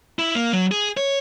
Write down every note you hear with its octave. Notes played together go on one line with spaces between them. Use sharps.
E4
A#3
F#3
G#4
C#5